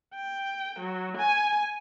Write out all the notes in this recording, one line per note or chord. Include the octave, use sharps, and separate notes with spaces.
G5
F#3
G#5